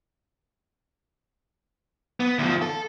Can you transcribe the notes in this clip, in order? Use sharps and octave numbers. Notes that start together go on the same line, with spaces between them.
B3
D2 F3
A4